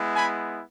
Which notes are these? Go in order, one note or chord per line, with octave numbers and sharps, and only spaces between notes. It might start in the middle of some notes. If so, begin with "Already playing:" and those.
Already playing: G#3 B3 E4
G#5 B5